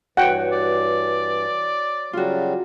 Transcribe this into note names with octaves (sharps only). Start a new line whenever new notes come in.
G2 E3 F#4 C#5 F#5 G5
D5
C#3 F#3 G3 F4 F#4